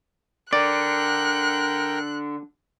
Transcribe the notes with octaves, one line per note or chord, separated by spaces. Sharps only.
D3 A#4 D5 G5 F#6